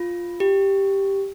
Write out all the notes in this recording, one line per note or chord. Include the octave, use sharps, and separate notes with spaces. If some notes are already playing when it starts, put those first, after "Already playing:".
Already playing: F4
G4